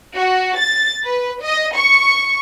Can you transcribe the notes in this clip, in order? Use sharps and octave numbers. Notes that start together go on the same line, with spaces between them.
F#4
A6
B4
D#5
C#6